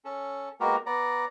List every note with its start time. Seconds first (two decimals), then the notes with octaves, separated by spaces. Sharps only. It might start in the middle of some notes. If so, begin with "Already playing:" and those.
0.05 C#4 A4
0.60 G#3 A#3 B3 F#4 G4 A#4
0.86 B3 D5 A#5